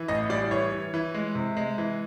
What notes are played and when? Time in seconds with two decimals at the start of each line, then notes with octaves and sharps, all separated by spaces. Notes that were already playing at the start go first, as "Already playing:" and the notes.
Already playing: E3
0.08 A1 D#5
0.30 G3 D5
0.51 E3 C#5
0.72 E3
0.94 E3
1.15 G#3
1.35 C3
1.57 G#3
1.78 E3